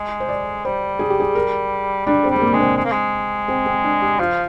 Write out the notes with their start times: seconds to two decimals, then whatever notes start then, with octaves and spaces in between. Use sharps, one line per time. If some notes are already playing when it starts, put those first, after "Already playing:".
Already playing: G#3 D#5
0.20 C5
0.29 D5
0.65 G3 C5
0.99 G#4
1.10 G4
1.20 G#4
1.35 A#4
2.06 G3 D4
2.24 C4
2.30 G3
2.36 C4
2.41 A#3
2.53 G#3 D4
2.59 C4
2.76 G#3
2.84 A#3
2.91 G#3
3.48 C4
3.66 C4
3.84 D4
4.02 G4
4.19 F3 F4